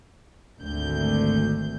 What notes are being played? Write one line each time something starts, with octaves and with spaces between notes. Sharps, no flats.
G#1 D2 G6